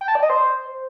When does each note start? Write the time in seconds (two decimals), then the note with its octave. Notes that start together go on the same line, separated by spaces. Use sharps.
0.01 G5
0.08 A5
0.15 D5
0.22 D#5
0.30 C5